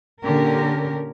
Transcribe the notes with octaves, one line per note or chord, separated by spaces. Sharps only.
A#2 D3 C#4 G4 A#4